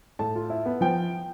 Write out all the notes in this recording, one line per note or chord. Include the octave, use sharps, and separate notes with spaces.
A2 A5
F4
E4
B3
F3 G5